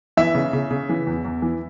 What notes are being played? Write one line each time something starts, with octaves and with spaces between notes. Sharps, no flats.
E3 E5
C#3
C#3
C#3
E3
E2
E2
E3